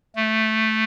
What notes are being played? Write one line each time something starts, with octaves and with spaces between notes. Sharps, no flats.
A3